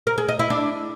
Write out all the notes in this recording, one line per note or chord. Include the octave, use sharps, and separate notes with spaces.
A#4
G#4
D#5
E4
D4